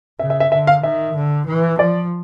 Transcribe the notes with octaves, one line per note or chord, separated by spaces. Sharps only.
C#3 E5
E5
E5
D3 E5
F5
D#3 E5
D3
E3
F3 D5